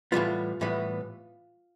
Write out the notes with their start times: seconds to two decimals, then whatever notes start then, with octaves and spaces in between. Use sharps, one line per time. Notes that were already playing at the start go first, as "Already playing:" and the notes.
0.12 A2 E3 G3 B3 F4
0.61 A2 E3 G3 B3